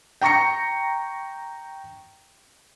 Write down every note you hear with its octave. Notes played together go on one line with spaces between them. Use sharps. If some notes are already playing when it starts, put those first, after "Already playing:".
G5 A#5 C#6 A#6 C#7